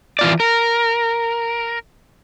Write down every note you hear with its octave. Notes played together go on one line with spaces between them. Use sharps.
E3 F4 D5
A#4